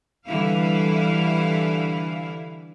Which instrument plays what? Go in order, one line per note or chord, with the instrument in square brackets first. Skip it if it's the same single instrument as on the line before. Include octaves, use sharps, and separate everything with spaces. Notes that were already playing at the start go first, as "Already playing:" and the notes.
[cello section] D3 E3 G3 E4 F5